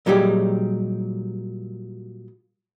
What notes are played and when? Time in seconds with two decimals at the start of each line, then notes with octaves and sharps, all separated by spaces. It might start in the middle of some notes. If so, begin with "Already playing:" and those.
0.06 A#2 F#3 G3 D#4 G4 G#4